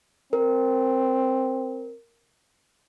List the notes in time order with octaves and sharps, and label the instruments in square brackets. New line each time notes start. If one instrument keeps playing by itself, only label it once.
[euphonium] C4 [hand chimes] A#4